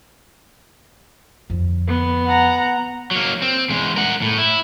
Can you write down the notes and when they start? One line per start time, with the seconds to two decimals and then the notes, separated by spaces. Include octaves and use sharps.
1.50 F2 D3
1.88 B3
2.26 F#5 A#5
3.11 F#3 A#3
3.42 C4
3.70 E2 G#3
3.96 A#4 F#5
4.22 A2
4.38 E4